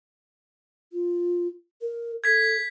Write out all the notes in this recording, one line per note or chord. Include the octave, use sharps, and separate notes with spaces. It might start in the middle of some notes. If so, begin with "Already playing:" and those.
F4
A#4
A4 G#6 B6